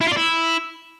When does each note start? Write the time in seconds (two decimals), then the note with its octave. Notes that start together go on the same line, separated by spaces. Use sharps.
0.01 E4
0.06 F4
0.12 D5
0.17 E4